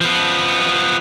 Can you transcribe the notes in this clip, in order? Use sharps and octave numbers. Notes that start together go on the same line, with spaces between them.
F3 B3